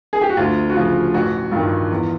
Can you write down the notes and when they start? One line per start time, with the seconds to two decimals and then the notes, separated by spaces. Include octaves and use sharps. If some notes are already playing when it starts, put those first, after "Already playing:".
0.13 G#4
0.21 G4
0.30 F#4
0.37 D2 F4
0.70 F#4
0.76 C#3 F3 F4
1.14 A1 F#4
1.52 G2 D#3 F4
1.90 E2